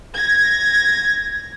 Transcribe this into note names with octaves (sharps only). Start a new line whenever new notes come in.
G#6 A#6